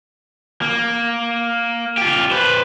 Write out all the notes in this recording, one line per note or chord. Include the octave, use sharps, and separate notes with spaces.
A#3
F4 G4
B4 C5